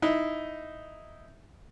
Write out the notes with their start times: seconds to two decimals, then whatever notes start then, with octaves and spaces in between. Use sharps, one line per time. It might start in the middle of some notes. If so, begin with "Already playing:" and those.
0.02 D#4 E4